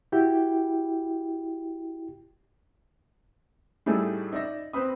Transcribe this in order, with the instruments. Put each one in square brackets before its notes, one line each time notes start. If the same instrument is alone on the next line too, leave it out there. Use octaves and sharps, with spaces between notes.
[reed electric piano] E4 F#4 G4 G5
[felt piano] A2 G3 A3 D#4 G#4 A4
D#4 D5 E5 A#6
C4 B4 B5 D#6